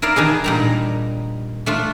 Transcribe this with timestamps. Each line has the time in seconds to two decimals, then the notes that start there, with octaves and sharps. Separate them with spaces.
0.02 E4 A#4 D5 F5
0.16 D#3 D4 D#4 G#4
0.44 A#2 G3 A#5
1.66 A3 D4 F4